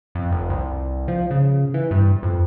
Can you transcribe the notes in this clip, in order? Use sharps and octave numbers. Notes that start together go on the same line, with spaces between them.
F2
F1
C2
F3
C#3
E3
G2
F2